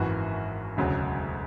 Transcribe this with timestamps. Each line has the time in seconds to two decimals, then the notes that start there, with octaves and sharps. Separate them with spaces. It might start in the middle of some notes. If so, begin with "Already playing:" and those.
Already playing: G#1 F#2 E3 F#4
0.77 E1 D2 C#3 F#3